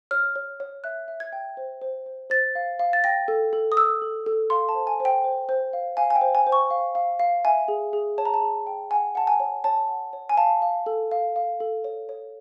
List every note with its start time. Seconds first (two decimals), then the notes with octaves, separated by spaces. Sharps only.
0.11 C#5 F6
0.36 C#5
0.60 C#5
0.84 E5 F#6
1.08 E5
1.20 G#6
1.33 G5
1.57 C5
1.82 C5
2.06 C5
2.30 C5 A6
2.55 F5
2.79 F5
2.93 A6
3.04 G5 A#6
3.28 A4
3.53 A4
3.72 D#6
3.77 A4 E6
4.02 A4
4.26 A4
4.50 F5 C6
4.69 A5
4.75 C5
4.87 G#5
5.00 C5 G5
5.24 C5
5.49 C5
5.73 F5
5.97 F5 G#5
6.10 G#5
6.16 G5
6.21 C5
6.35 G#5
6.47 C5
6.52 C#6
6.70 F5
6.95 F5
7.20 F5
7.45 E5 G#5
7.68 G#4
7.93 G#4
8.18 C#5 A5
8.25 A#5
8.34 A5
8.41 G#4
8.67 G5
8.91 F#5 G#5
9.15 F#5 A5
9.27 G#5
9.40 C#5
9.64 C#5 A5
9.88 F#5
10.13 C#5
10.29 G#5
10.37 F5 A5
10.62 F5
10.86 A4
11.11 F5
11.36 F5
11.60 A4
11.84 C#5
12.09 C#5